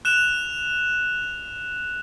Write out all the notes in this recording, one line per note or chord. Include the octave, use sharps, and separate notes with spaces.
F#6 E7 F7